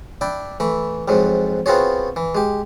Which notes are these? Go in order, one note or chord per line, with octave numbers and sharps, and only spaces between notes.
D4 E4 G5
E3 A3 B5
F2 G#2 F#3 G#3
B3 C4 F4 F#4 G#4 C#5
E3
G#3 G4